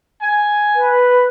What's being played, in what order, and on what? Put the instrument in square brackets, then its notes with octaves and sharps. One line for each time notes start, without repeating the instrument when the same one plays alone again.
[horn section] G#5
[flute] B4